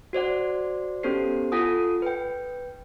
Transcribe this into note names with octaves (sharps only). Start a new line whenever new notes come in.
F#4 C5 D5 F#5
B3 C#4 G4 A4 C5 C7
F4 A4 F#5 G#5 D#6
B4 G5